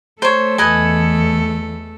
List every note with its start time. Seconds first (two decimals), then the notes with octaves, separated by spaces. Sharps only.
0.22 A3 A4 C5 C#5
0.58 E2 B4 D#5 G#5